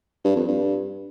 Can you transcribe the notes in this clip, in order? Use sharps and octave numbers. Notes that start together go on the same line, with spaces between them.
G2
F2
G2